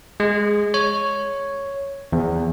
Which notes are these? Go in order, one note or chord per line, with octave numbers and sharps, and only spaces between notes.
G#3
C#5
E2